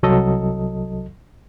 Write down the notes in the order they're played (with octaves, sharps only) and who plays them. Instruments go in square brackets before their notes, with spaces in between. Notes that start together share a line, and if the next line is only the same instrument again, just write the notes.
[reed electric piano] C2 F#3 A4 D#5